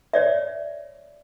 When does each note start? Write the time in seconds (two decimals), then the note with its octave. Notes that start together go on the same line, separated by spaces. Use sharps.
0.13 C#5 D5 E5